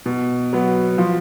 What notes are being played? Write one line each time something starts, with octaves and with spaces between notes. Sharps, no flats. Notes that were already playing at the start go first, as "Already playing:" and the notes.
B2
F#3 B3 F#4
F3